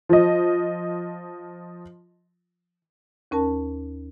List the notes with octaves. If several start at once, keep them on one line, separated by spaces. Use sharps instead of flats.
F3 D#5
D#2 C#4 A#4 A5